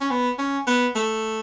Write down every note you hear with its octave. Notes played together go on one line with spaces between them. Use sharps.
C#4
B3
C#4
B3
A3